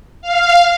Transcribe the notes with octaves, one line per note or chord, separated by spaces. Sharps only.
F5